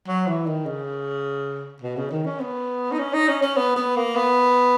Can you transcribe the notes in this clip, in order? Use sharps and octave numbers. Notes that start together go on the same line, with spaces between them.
F#3
E3
D#3
C#3
B2
C#3
D#3
C#4
B3
D#4
C#4
D#4
C#4
C#4
B3
B3
A#3
B3